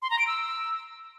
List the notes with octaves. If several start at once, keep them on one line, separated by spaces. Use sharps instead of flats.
C6
A#5
D7
E6